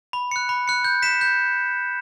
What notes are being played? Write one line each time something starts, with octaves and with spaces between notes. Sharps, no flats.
B5
F#6 C#7
B5
F#6 C#7
G6
B6 E7
G6